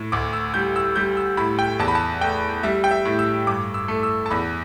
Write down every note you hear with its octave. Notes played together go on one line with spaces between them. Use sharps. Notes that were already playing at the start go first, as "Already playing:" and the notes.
Already playing: A2
D2 D6
E6
G3 G6
E6
G3 G6
E6
A2 B5
G5
E2 A5
B5
A5
A3 G5
G3 E5
G5
E5
A2
E6
G2 D6
E6
A3
E6
A5
E2 B5